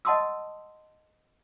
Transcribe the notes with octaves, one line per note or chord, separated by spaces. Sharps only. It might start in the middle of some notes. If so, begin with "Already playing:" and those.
D#5 F#5 A5 C6 D#6 E6